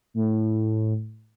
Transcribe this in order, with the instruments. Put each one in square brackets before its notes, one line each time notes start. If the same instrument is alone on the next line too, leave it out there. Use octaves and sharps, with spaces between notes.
[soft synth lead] A2